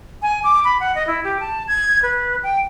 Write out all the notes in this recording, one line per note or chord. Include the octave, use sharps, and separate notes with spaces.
G#5
D6
B5
F#5
D#5
E4
G4
A5
G#6
B4
G5